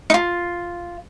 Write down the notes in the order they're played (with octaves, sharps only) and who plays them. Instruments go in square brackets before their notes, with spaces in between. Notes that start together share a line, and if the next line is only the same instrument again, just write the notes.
[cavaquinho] D#4 F4